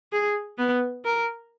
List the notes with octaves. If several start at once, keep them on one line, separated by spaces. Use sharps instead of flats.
G#4
B3
A#4